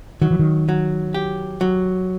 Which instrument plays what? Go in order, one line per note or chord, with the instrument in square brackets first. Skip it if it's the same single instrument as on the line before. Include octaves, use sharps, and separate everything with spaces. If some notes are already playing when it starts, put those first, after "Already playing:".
[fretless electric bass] D#3 [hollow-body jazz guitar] F#3
[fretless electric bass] E3
D#3
[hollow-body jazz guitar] F#3
G4
F#3